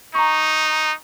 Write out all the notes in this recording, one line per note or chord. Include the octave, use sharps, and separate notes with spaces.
D#4 A#5 C#6